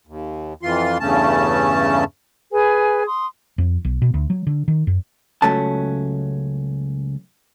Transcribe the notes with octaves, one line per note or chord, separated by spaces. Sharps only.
D#2
F2 E3 F4 C6
E2 G2 C#3 A3 C#4 A5
G#4 B4 G#5
C6 D#6
F2
B1
B2
D2
F#3
D3
D#3
F#2
C#2 F#3 A3 C#4 A5